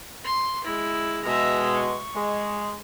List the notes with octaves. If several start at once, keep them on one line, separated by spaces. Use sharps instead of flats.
C6
G#3 E4
B2 G#3 E5 A#5
C#6
G#3